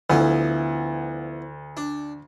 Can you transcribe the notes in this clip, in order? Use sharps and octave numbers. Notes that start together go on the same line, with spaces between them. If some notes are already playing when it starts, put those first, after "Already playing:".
D2 E3 F3 B3
D4